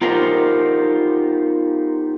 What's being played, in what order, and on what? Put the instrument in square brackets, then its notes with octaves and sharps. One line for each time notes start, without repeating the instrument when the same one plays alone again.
[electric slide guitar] B3 D#4 F4 G4 A#4 C5